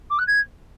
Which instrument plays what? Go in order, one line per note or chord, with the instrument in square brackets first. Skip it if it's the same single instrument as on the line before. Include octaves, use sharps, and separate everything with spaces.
[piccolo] D6
F#6
G#6